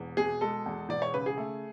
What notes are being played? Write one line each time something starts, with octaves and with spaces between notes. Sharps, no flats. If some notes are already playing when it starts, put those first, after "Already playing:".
Already playing: E1 E2
B2 G#4
G#3 A4
E2
E1 D5
C#5
C#3 B4
G#4
A3